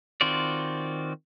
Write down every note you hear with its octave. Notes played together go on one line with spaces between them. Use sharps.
D#3 C4 F4 F#4 D5